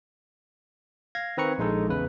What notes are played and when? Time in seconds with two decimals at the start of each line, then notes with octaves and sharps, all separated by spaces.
1.15 F5 G#6 A#6
1.37 D#3 C4 B4 A#5 C#6 C#7
1.58 A#1 G#3 D#4 A4
1.89 E2 C#3 B4